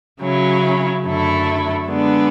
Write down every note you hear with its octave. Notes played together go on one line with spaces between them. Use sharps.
C#3 F#3 C#4 E4
F#2 D3 F#3 A3 E4
D3 G#3 B3 D4